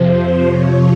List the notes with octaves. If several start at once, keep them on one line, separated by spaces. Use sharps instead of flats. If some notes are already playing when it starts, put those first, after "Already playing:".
Already playing: F2 C3 F3 C5
C#5